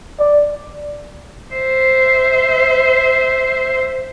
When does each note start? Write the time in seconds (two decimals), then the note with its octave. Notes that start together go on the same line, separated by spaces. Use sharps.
0.19 D5
1.54 C5 E5